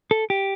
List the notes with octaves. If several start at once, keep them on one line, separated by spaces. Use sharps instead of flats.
A4
G4